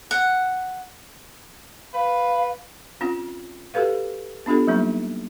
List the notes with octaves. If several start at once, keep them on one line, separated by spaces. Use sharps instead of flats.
F#5
B4 F5
C4 C#4 F4
F#4 G4 A4 B4 F5
B3 D4 F4 G4 A4
F#3 G3 A#3 C4 D#4